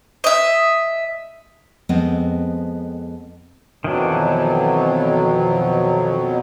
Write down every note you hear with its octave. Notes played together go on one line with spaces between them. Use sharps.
D#5 E5
F2 G#3 B3 C4
F2 B2 D#3 E3 F#3 D4